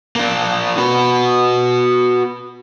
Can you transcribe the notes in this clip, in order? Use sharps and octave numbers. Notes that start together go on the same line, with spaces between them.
A#3 D4
F#4 B4